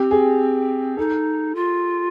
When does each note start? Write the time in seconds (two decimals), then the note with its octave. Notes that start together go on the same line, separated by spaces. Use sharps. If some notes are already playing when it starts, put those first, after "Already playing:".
Already playing: C4 G4
0.11 G#4
0.97 D#4 A4
1.55 F4